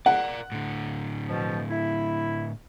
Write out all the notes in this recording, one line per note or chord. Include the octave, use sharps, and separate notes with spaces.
A#4 D5 F#5
A2 D3
B2 F3
E4